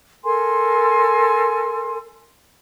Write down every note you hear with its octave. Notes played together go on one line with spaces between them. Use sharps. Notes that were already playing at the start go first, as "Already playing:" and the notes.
A4 A#4 G#5 C6